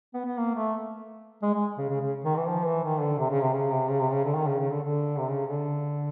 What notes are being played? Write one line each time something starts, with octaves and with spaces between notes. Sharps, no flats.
B3
B3
A#3
A3
G#3
G#3
C#3
C#3
C#3
D#3
E3
F3
E3
D#3
D3
C3
C#3
C3
C#3
C3
C#3
C3
C#3
D3
D#3
C#3
C#3
D3
D3
C3
C#3
D3